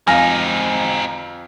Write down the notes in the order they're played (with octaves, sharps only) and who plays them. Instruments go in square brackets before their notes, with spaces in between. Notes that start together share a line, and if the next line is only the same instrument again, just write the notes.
[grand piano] F2 F5 [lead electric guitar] C4 D#4 [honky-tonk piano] G#5 F6 A#6